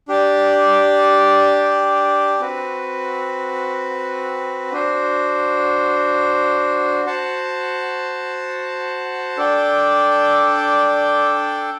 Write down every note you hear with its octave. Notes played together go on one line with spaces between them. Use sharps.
D4 G4 D5
C4 F#4 B4
D4 F#4 C5
F#4 C5 F#5 A5
D4 A4 D5 G5